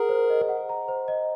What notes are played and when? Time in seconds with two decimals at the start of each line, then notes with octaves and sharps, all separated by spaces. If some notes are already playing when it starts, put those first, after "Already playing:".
Already playing: G#4 A#4 F#5 A#5
0.09 C5
0.30 D#5
0.49 F#5
0.69 A#5
0.88 C5
1.08 D#5